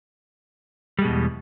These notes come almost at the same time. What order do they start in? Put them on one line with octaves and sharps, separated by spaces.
G3 G#3 B2 E2